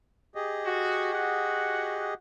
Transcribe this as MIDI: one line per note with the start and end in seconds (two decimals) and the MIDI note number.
0.35 2.14 67
0.35 2.14 68
0.35 2.14 75
0.65 1.10 66
1.14 2.15 66
1.14 2.15 78